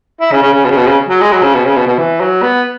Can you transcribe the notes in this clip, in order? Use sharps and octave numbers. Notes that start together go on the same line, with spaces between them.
E4
C#3
C#3
C#3
B2
C#3
B2
C#3
F#3
G#3
F#3
C#3
B2
C#3
B2
B2
E3
F#3
B3